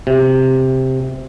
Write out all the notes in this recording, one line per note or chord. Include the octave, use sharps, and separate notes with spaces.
C3